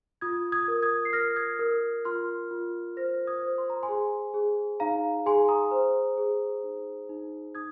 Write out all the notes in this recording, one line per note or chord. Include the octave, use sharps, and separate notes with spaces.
F4 D#6 G#6
D#6 G#6
A#4
D#6 G#6
C7
A#4 F6 A#6
D#6 G#6
A#4
F4 C6 F6
F4
C5 F6 A#6
D#6 G#6
C5
C6
A#5
G#5 C6
G#4
G#4
D#4 F5 A#5
G#4 G#5 C6
A#5 D#6
C5
G#4
D#4
D#4
D#4 D#6 G#6